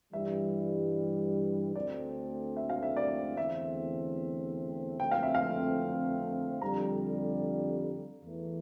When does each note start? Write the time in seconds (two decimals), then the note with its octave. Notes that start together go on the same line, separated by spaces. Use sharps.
0.13 G2 E3 G3 E5
1.75 D2 D3 A3 C4 D5
2.57 E5
2.70 F5
2.83 E5
2.97 D5
3.37 E2 D3 A3 C4 E5
4.99 F2 D3 A3 C4 G5
5.11 F5
5.23 E5
5.35 F5
6.61 F2 D3 G3 A#5
8.23 E2 E3 A3